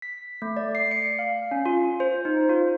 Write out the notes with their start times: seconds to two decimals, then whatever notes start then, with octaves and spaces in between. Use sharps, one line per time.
0.02 B6
0.42 A3
0.57 D5
0.75 C7
0.91 C#7
1.19 F5
1.51 C#4
1.66 F4
2.00 C5
2.25 D#4
2.49 F4